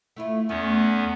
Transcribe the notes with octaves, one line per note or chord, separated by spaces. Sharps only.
A3 E4 F4
E2 A3 B3 C#4